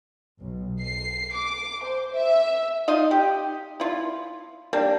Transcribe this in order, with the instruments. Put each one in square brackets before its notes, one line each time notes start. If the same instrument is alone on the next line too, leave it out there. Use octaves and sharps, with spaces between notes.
[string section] B1
C7
D6
C5
E5
[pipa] D#4 F4 D#5 F5
G4
E4 F4
G3 A#3 D4